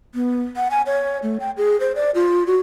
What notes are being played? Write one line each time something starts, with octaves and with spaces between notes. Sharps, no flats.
B3
F#5
G#5
C#5
A3
G5
G#4
C5
D5
F4
F#4